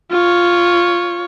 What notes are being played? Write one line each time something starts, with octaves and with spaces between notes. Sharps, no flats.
F4 C#5